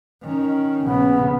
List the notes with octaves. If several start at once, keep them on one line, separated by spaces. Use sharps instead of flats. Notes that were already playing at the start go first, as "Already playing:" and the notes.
D#3 C#4
A#1 C#3 B3